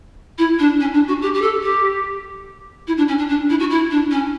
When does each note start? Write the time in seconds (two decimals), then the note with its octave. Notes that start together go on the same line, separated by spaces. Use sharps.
0.38 E4
0.58 D4
0.80 C#4
0.93 D4
1.07 F#4
1.21 G4
1.33 G4
1.41 A4
1.62 G4
2.87 E4
2.97 D4
3.08 C#4
3.18 D4
3.28 D4
3.49 E4
3.59 F#4
3.70 E4
3.90 D4
4.10 C#4